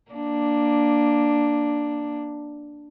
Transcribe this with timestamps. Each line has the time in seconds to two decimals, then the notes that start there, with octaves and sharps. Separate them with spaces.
0.12 A#3 D4